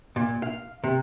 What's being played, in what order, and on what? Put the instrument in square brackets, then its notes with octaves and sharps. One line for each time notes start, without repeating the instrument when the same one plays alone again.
[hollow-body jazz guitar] A#2
F5
C3